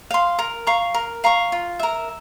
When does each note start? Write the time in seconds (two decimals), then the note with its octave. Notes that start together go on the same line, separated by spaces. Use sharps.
0.11 F5 C6
0.39 A#4
0.67 F5 A#5 C#6
0.94 A#4
1.24 F5 A#5 C#6
1.52 F4
1.79 A#4 E5